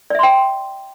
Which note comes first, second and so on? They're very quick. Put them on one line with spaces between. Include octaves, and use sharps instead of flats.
D5 E5 C6 G5